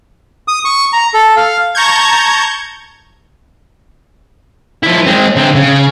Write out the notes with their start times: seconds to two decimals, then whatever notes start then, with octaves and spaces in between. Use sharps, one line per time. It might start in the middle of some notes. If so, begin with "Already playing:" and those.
0.48 D#6
0.65 C#6
0.93 A#5
1.14 A4
1.37 F5
1.75 A5 A#5 C#6 G6 G#6
4.83 F3 E4
5.06 G#3 C4
5.36 D3 C4
5.55 C#3